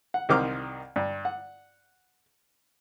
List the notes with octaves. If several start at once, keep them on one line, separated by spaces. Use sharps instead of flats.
F#5
C2 D#3 C5 D6 F6
G2
F#5